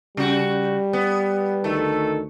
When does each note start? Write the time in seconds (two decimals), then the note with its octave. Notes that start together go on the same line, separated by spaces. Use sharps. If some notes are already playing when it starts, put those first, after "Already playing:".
0.17 C#3 G3 F#4
0.93 B3
1.64 D2 D#3 A3 A4